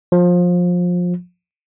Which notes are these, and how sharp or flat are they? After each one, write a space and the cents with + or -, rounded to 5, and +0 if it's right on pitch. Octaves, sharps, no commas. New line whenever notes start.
F3 +25